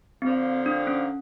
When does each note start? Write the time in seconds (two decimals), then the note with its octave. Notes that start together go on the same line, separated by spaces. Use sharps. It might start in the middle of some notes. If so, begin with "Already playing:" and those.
0.22 D3 F3 A#3 C4
0.66 D4
0.87 C#4